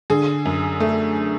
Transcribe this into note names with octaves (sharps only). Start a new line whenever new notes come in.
D3 G#4
F#2
A3